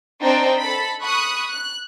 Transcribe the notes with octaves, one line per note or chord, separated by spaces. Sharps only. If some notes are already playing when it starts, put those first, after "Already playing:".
C4 D4 D#4 C5 D5 G5
A4 B5
B5 C#6 D#6 F#6
F#6